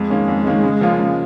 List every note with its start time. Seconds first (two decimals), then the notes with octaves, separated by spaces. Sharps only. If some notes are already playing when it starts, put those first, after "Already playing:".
Already playing: F2 G#3
0.10 D#3 A#3 C#4
0.28 F2
0.47 D#3 A#3 C#4
0.64 C#3
0.81 F3 A#3 C#4 F4
0.99 C#3